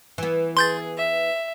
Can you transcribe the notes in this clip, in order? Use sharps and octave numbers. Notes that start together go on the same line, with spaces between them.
E3 B3
G#4 C6 G6 A6
E5